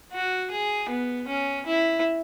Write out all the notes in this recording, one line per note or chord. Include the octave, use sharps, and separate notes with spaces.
F#4
G#4
B3
C#4
E4